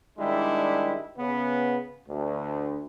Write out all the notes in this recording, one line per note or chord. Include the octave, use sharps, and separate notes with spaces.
D#3 G3 G#3 D4 E4
C#3 B3
D2